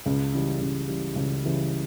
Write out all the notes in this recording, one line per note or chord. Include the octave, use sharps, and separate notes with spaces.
C#2
C#3 E3 G3
C#2
C#3 E3 G3
C#2
C#3 E3 G3